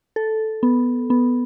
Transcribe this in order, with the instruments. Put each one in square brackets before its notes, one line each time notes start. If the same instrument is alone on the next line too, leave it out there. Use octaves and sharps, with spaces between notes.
[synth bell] A4
B3
B3